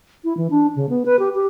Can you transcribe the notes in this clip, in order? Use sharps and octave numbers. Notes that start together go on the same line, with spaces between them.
E4
E3
D4
C#3
B3
B4
G4
G4